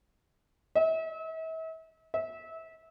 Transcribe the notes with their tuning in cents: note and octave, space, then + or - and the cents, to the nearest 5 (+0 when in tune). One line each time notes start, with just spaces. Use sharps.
E5 -40
E5 -25